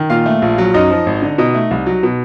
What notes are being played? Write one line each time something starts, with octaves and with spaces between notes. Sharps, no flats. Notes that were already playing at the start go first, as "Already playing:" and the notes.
Already playing: D#3
A#2 F4 F5
A3
A#1
F#3
F#2 D#4 D#5
F3
G#1
D3
B2 D#4 D#5
A3
C2
F#3
B2